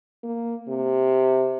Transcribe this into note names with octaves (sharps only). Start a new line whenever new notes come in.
A#3
C3